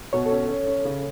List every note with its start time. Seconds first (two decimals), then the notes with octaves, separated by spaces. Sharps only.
0.13 B2 C#5
0.26 A4
0.32 C#4
0.49 C#4
0.67 C#4
0.85 C#3